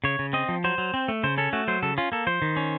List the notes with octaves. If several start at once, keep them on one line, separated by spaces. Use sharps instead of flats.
C#3 C#5
C#3
C4 D#5
F3
F#3 C5
F#3
C4
A3
C#3 C5
C#4 A4
A3 F#4
F#3 C5
C#3 A4
C#4 F4
A#3 A4
F3 C5
D#3
C#4